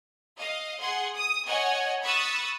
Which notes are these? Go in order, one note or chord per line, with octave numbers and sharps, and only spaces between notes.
D#5 F5
G#4 F#5 C6
D#6
C#5 D#5 F#5 G#5
B5 C#6 D#6 E6 F#6 A6